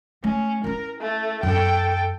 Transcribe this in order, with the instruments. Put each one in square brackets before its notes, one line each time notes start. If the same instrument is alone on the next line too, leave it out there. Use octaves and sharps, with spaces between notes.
[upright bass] A3 [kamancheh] C#4
[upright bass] C#4 E4 [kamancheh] A#4
[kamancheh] A3
[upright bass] F#2 [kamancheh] A4 G5